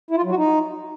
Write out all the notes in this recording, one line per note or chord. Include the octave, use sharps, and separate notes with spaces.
E4
F4
F#3
F#4
D#4